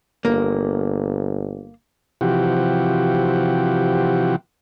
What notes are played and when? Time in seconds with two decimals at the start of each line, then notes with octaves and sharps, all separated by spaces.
0.25 G1 A#3
2.21 C3 E3 F3 F#4 G4